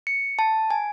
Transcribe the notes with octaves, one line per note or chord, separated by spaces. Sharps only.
C#7
A5
G#5